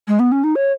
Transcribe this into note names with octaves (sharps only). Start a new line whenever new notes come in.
G#3
B3
C#4
D#4
C#5